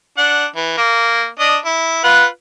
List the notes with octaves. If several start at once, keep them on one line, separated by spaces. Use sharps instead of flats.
D4 F#5
E3
A#3
D4 D#5
E4
F4 B4 F#5